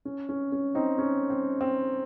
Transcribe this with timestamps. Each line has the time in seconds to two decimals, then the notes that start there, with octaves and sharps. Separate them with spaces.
0.05 C#4
0.29 C#4
0.52 C#4
0.75 C4 D#4
0.98 C#4
1.30 C4
1.61 C4